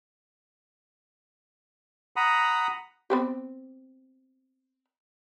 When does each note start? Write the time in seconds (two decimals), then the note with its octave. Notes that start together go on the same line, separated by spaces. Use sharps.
2.16 F#5 A#5 B5 D#6
3.10 B3 C4 G4